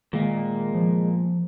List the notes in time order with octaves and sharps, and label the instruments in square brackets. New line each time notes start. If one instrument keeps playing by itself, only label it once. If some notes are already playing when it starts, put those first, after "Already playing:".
[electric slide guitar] A#2 A#3 [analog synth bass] D#3 [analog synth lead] G#3
[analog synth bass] F3